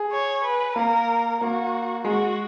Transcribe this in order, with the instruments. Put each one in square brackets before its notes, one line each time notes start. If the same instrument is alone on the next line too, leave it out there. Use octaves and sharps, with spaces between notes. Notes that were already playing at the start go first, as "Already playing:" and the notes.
Already playing: [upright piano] G#4
[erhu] C#5
B4
[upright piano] A#3 [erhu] A#4
[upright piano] A#3 [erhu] F#4
[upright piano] G#3 [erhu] F#4